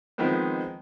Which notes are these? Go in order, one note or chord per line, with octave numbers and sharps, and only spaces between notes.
D#3 F3 G#3 B3 C4